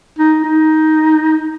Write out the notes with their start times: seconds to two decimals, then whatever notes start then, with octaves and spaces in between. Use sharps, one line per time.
0.18 D#4
0.44 D#4